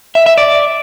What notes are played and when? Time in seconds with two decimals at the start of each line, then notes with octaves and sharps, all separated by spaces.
0.15 E5
0.26 E5
0.38 D5